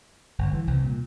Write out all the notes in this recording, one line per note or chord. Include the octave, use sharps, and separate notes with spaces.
G1
E3
C2
A#2